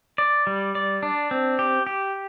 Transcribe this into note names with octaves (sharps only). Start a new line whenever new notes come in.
D5
G3
D5
D4
C4
G4
G4